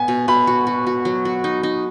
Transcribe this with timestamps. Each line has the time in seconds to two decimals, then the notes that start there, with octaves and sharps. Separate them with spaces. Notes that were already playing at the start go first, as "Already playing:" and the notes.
Already playing: B3 G#5
0.08 B2
0.28 B2 B5
0.47 F#4
0.67 F#4
0.87 F#4
1.05 F#3
1.25 F#4
1.44 D#4
1.63 D#4